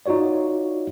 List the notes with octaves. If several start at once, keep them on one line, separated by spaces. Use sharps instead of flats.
D#4 F4 F#4 C#5 D5